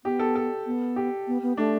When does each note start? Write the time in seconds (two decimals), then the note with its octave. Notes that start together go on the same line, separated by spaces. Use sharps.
0.05 B3 G4
0.19 A4
0.35 A4
0.66 B3
0.96 G4
1.27 B3
1.42 B3
1.57 A3 D4